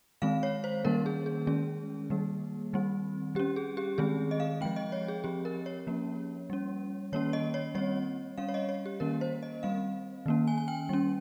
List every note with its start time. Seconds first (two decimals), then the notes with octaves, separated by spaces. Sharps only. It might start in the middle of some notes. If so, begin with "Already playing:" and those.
0.22 D#3 G#3 C4 F5
0.43 C#5
0.64 C5
0.84 D#3 G3 A#3 C#4 A#4
1.06 G#4
1.26 G#4
1.47 D#3 G#3 C#4 G#4
2.10 D#3 G3 A#3
2.73 D#3 G3 C4
3.35 G3 C#4 G4
3.56 G#4
3.77 G4
3.98 D#3 G#3 C4 G#4
4.31 D#5
4.40 F5
4.61 F3 G#3 C4 G5
4.76 D#5
4.92 C#5
5.08 G#4
5.24 F3 C4 G4
5.45 A#4
5.66 C#5
5.87 F3 A#3 C#4
6.50 G3 C#4
7.13 D#3 A#3 C#4 C#5
7.33 D#5
7.54 C#5
7.75 G3 C4 C#5
8.38 G3 C#4 F5
8.49 C#5
8.54 D#5
8.69 C#5
8.86 G4
9.00 D#3 A#3 C#4 A#4
9.21 C5
9.43 D#5
9.63 G3 C4 F5
10.26 D#3 A#3 C#4
10.47 G#5
10.58 G#5
10.68 G5
10.89 G3 C#4